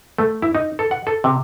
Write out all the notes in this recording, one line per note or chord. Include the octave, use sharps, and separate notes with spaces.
A3
E4
D#4
A4
F#5
A4
C3